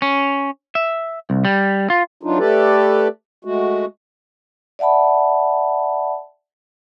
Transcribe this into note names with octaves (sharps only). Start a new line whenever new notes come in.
C#4
E5
C2
G3
F4
E3 F#3 D4 D#4 F4
A3 G4 A4 B4 D5
G#3 A3 F#4
D5 E5 F#5 A5 B5